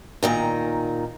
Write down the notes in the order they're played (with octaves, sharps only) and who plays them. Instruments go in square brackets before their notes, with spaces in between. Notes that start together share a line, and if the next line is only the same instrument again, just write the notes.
[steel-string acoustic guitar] A#2 D#3 A#5